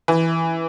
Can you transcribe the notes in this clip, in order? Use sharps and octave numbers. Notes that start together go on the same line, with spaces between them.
E3